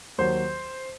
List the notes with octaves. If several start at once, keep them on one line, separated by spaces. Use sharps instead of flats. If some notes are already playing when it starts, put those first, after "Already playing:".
D#2 D#3 F#3 C5